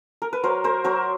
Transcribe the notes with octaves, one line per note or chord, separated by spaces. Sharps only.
A#4
B4
F#3 A#4 C5
A#4 C5
F#3 A#4 C5